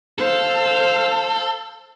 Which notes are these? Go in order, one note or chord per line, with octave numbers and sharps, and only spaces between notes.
A4 C5 F5